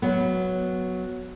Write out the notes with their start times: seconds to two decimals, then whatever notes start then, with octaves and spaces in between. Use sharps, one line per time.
0.02 F#3 B3